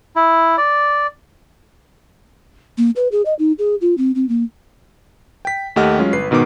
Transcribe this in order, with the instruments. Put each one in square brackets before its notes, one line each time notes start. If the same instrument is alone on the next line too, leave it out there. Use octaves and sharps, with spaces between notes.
[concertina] E4
D5
[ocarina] A#3
B4
G#4
D#5
D#4
G#4
F4
C4
C4
A#3
[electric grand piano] G5 B6
D#2 A3 G4 D#5 F#5 F6
F#3 G#3 C#4 F4
G1 B4 C7
G#2 B2 D#3 B3 D6